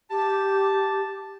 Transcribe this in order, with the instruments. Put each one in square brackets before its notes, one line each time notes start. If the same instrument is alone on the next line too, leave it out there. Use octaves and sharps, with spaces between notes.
[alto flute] G4 [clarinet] A5